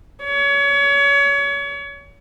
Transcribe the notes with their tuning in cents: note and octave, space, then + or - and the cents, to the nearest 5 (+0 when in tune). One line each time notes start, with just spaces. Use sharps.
C#5 +30